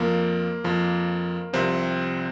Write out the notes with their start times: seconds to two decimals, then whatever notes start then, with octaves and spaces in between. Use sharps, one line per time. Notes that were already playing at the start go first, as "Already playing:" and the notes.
Already playing: F2 F3 A#3
0.64 F2 F3
1.53 C2 C3 F3 C4